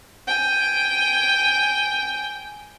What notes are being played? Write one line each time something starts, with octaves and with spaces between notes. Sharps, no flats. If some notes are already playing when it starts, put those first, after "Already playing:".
G5 G#5